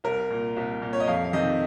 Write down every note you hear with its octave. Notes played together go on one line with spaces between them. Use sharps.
C2 A#4
A#2
C2
A#2
C#5
D#5
F2 F5
F5
C3 D#3 D#5